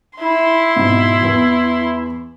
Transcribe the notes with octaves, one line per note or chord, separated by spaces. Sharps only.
E4 C6
G#2 B2
E2 B3